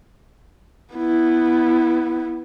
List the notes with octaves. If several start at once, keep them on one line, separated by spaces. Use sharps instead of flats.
B3 E4